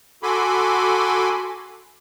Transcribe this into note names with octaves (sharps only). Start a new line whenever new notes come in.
F#4 A4 G#5 B5 C6 D6